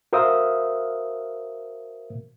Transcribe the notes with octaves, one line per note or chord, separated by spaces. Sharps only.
F#4 A#4 C5 E5 F5 D#6